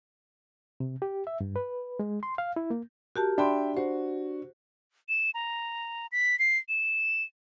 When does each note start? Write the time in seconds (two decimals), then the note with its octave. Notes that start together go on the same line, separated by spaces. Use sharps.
0.80 C3
1.02 G4
1.27 E5
1.41 G2
1.56 B4
1.99 G#3
2.23 C6
2.38 F5
2.56 E4
2.70 A#3
3.16 F#4 G4 A#4 A5
3.38 D4 E5 G5 B5 C6
3.77 F#4 C5
5.09 E7
5.34 A#5
6.12 B6
6.39 C7
6.69 E7